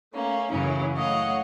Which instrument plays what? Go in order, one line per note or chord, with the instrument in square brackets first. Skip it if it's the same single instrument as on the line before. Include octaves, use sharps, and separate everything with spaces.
[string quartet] A3 A#3 C#4
F#2 C#3 E3 F#3 C#4 E4
A3 C#5 D#5 F5 F#5